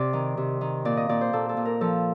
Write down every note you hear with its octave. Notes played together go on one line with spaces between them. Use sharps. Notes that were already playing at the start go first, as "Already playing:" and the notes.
Already playing: C3 D5
D#3
C3
D#3
A#2 D5
D#5
A#2 D5
C5
A#2 A4
A4
A#2
A#4
F3 A4